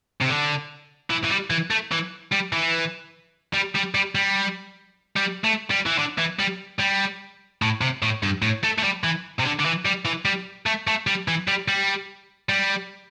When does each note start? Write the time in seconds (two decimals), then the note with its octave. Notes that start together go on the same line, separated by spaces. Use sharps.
0.21 C3
0.29 D3
1.10 E3
1.24 E3
1.30 G3
1.50 E3
1.71 A3
1.92 E3
2.32 G3
2.53 E3
3.54 G3
3.75 G3
3.94 G3
4.15 G3
5.17 G3
5.44 A3
5.71 G3
5.86 E3
5.98 D3
6.18 E3
6.40 G3
6.80 G3
7.62 A2
7.81 C3
8.03 A2
8.23 G2
8.42 A2
8.64 A3
8.78 A3
8.83 G3
9.04 E3
9.40 C3
9.45 D3
9.60 D3
9.65 E3
9.85 G3
10.05 E3
10.25 G3
10.66 A3
10.88 A3
11.07 G3
11.28 E3
11.48 G3
11.68 G3
12.49 G3